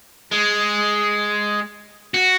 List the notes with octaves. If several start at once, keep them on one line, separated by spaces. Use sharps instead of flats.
G#3
F#4